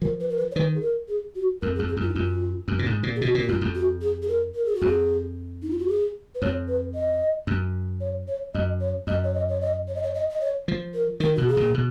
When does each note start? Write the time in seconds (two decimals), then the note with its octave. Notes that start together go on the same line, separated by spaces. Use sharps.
0.02 F3 A#4
0.20 B4
0.29 A#4
0.37 B4
0.51 C#5
0.55 D#3 B4
0.75 G#4
0.81 A#4
1.08 G#4
1.35 F#4
1.62 F2 A#4
1.75 G#4
1.79 F2
1.88 G#4
1.97 F#2 F4
2.09 D#4
2.14 F#2 F4
2.68 F#2
2.79 A#2
2.86 G#2
3.03 A#2
3.16 G#4
3.21 B2 F#4
3.35 A#2
3.42 F#4
3.48 F#2 F4
3.61 F2
3.75 F#4
4.02 G#4
4.22 G#4
4.28 A#4
4.55 A#4
4.66 G#4
4.75 F#4
4.82 F2 G#4
5.62 D#4
5.70 F4
5.79 F#4
5.88 G#4
6.35 B4
6.42 F2 C#5
6.68 B4
6.95 D#5
7.47 F#2
8.00 C#5
8.28 C#5
8.54 F#2 D#5
8.81 C#5
9.07 F#2 D#5
9.24 C#5
9.34 D#5
9.49 C#5
9.61 D#5
9.88 C#5
9.95 D#5
10.03 C#5
10.15 D#5
10.30 D#5
10.41 C#5
10.68 F3
10.94 A#4
11.20 D#3 A#4
11.35 B2 F#4
11.48 G#4
11.57 A#2
11.74 B2